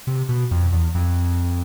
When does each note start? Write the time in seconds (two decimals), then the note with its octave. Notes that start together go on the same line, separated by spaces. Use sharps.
0.07 C3
0.29 B2
0.51 F2
0.72 E2
0.95 F2